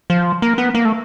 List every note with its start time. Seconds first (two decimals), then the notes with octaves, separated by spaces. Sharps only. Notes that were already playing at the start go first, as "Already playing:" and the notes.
0.10 F3
0.42 A#3
0.58 B3
0.75 A#3
0.85 A3